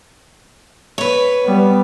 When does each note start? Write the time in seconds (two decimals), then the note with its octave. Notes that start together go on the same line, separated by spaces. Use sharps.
0.98 B4 C#5
1.46 G3 B3